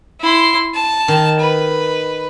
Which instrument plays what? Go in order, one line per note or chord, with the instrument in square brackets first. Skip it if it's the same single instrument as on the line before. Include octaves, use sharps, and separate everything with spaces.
[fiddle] E4 C6
A5
[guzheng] D#3
[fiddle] B4